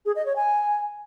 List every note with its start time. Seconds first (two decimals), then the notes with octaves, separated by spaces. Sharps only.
0.06 G#4
0.16 D#5
0.26 C#5
0.36 G#5